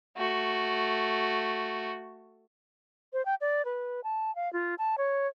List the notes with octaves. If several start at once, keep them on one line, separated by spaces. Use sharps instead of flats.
A3 F#4
C5
G5
D5
B4
A5
F5
F4
A5
C#5